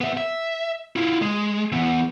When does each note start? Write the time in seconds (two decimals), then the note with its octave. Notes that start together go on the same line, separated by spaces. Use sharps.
0.01 B3 E5
0.17 E5
0.96 E4 F4
1.22 G#3
1.72 E3 B3